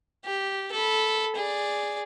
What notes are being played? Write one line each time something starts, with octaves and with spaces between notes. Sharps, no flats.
G4
A4 B5
G#4 D5